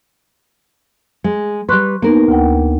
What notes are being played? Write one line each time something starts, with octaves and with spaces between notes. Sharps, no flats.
G#3
G3 B4 C6 C#6 F#6
A#3 B3 D#4 A#4 B4
D2 F#5 G5